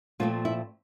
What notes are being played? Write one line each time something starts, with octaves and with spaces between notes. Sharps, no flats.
A#2 F3 A3 C4 F4
E4